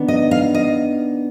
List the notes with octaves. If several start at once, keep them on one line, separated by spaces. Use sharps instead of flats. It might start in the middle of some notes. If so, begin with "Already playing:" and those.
Already playing: D#3 B3 D4
D#5
F5
D#5